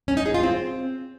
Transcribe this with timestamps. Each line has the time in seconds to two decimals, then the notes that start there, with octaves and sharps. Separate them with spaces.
0.08 C#4
0.17 D#4
0.26 G#4
0.34 F4
0.43 C4